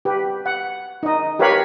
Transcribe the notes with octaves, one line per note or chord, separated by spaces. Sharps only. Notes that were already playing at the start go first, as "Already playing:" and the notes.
G4 B4
F#5
D#4 D#5
G4 A#4 B4 C#5 F5 B5